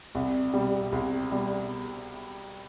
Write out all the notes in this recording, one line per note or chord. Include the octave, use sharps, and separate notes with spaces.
C2
B2 G3
C2
B2 G3